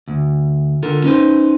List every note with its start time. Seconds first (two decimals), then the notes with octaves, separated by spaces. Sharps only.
0.08 D2
0.83 D3 F4 A4 A#4
1.04 C#4 D#4 B4 C5